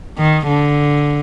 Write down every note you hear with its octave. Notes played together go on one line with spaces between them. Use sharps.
D#3
D3